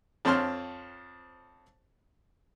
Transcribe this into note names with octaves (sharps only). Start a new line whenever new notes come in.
F2 C4 C#5 A5 C6 F6